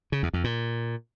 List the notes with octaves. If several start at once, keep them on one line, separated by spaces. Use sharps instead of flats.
C#3
E2
F2
A#2